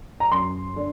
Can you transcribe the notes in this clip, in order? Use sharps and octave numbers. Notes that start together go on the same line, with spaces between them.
A#5
F#2 C6
D3